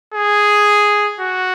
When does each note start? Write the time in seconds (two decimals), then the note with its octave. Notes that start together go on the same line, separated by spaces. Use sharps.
0.14 G#4
1.20 F#4